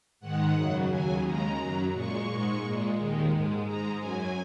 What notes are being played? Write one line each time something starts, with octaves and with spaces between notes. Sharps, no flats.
G#2 D#3 G#3 F#5
F#2 C#3 F#3
D#2 C#3 F#3 G#5
D#2 C#3 G#3 A#5
F#2 F#3
A#2 G#3 C#6
G#2 G#3
A#2 G#3
D#2 D#3 G#3
G#2 G#3
G#2 G#3 A#5
F#2 F#3 G#5